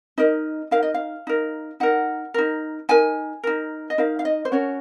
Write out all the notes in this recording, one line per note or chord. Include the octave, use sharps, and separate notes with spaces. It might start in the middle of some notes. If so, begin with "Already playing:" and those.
D#4 A#4 D#5
D#4 A#4 F5
D#5
F5
D#4 A#4
D#4 A#4 F#5
D#4 A#4
D#4 A#4 G#5
D#4 A#4
D#5
D#4 A#4 F5
F5
D#5
C5
C#4 F#4 A#4 C#5